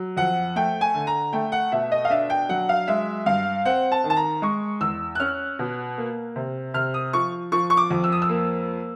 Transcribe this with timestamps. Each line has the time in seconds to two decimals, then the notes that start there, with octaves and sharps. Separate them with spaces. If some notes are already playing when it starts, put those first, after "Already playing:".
Already playing: F#3
0.17 F2 F#5
0.56 A3 G5
0.81 G#5
0.94 D3
1.07 A#5
1.33 A3 G5
1.52 F#5
1.72 B2 E5
1.92 D#5
2.05 F5
2.10 D4 E5
2.30 G5
2.49 F#3 F#5
2.69 F5
2.87 G#3 E5
3.26 G2 F5
3.65 C4 F#5
3.92 A5
4.04 D#3
4.10 A5
4.17 A#5
4.42 G#3 C#6
4.81 E2 E6
5.15 F#6
5.20 C#4 F6
5.59 B2
5.98 A#3
6.36 C3
6.74 C3 F6
6.94 D#6
7.13 F3 C#6
7.52 F3 C#6
7.70 C#6
7.77 D6
7.90 F2
8.04 E6
8.12 D#6
8.22 E6
8.29 A#3